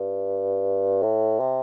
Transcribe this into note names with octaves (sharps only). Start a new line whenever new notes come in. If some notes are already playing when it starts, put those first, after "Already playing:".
Already playing: G2
A2
C3